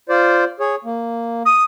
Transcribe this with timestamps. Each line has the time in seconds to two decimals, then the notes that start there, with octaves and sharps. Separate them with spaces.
0.09 F4 C5 D5
0.60 G#4 C#5
0.85 A#3
1.46 D#6